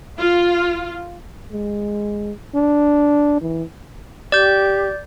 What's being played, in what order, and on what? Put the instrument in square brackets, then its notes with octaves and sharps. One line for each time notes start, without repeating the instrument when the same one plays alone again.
[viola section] F4
[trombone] G#3
D4
E3
[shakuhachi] G4 [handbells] D5 G6